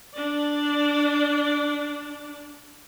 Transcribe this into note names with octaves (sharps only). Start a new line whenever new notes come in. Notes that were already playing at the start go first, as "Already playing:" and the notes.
D4 D5